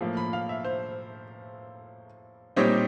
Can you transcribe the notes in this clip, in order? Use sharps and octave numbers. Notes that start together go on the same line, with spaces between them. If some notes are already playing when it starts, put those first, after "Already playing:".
A2 F3 A#3
B5
F5
E5
C5
A#2 G3 C4 D#4 C#5